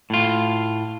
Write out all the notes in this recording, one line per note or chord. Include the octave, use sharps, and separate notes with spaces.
A2 F4